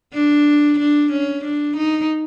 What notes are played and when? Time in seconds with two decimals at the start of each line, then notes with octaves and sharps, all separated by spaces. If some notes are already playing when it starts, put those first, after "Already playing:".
0.14 D4
0.79 D4
1.12 C#4
1.45 D4
1.77 D#4